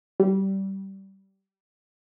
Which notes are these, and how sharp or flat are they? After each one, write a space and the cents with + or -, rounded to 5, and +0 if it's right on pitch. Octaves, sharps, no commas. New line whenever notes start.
G3 -20